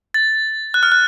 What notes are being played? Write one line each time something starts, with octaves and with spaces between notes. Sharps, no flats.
A6
F#6
F6
F#6